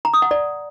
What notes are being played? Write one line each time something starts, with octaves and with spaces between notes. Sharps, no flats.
A#5
D#6
F#5
D5